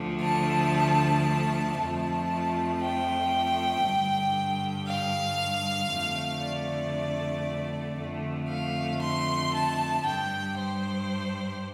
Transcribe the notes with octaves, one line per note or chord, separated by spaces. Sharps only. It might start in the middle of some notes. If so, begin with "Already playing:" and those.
Already playing: D2 D3 F3 A3
A5
F2 F3 A3 A5
G5
G2 D3 G3
F5
F2 D3 A3
D5
F2 D3 A3
F5
C6
A5
G2 G3 G5
C5